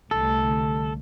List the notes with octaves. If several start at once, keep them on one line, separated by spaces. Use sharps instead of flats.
C2 D3 A3 A4